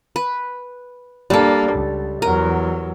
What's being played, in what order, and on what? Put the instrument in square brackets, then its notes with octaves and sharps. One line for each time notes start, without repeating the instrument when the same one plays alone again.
[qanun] B4
[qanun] G3 A4 [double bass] A#3 D4
[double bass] C#2
[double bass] E2 F#3 [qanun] A#4